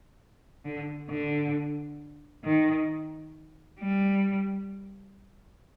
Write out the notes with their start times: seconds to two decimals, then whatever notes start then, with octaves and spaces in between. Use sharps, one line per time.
0.65 D3
1.10 D3
2.44 D#3
3.80 G3